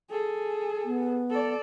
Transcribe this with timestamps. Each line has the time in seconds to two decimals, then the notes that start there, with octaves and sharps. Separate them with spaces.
0.10 G#4 A4
0.85 B3
1.30 A4 D5